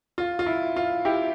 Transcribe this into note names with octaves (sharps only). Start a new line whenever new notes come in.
F4
F4
E4
F4
E4 G4